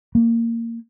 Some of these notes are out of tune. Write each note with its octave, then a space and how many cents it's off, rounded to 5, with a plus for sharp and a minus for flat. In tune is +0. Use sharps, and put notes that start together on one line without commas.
A#3 -15